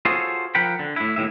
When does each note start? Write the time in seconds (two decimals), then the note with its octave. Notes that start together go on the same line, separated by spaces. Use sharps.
0.05 F4 F#4 G#4 A4 C5 C#5
0.55 F3 A#4 F#5 G5 B5
0.79 D3
0.96 A2 E4
1.16 D#2 A2 E5